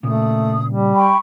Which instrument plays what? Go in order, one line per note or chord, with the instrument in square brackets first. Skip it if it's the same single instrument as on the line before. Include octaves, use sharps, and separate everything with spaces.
[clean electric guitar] A#2 C#3 [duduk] A3 [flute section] D#6
[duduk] G3
[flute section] G5 B5 C#6